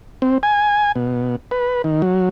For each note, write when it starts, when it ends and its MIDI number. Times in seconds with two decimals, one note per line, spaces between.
0.22 0.38 60
0.43 0.92 80
0.96 1.36 47
1.51 1.82 71
1.84 2.02 51
2.02 2.29 54